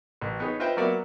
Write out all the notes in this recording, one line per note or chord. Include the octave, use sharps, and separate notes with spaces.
A1
B3 D#4 G#4 C#5
F4 B4 C5 D#5 E5 G5
F#3 A#3 B3 D5 E5 F#5